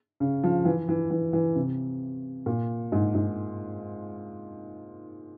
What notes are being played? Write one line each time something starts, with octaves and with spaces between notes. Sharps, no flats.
C#3
F3
E3
E3
E3
E3
C3
A#2
G#2
G#2